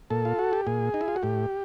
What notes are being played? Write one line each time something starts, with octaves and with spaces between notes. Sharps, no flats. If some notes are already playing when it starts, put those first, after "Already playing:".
A#2 A4
F4
F#4
G4
A#2 G#4
D#4
E4
F4
F#4
A2 G4